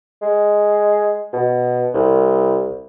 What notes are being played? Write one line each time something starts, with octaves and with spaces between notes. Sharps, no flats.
G#3
B2
C2